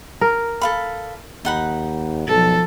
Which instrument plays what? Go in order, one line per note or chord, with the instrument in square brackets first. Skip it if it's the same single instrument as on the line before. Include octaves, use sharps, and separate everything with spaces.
[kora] A#4
[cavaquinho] A4 F5 B5
[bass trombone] D#2 [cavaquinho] D#4 F#5 B5
[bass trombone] B1 [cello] F3 A4